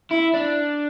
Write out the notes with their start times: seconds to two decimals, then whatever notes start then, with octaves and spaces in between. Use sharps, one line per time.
0.11 E4
0.34 D4